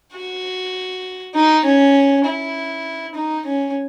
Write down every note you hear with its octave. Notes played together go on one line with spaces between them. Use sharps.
F#4
D#4
C#4
E4
D#4
C#4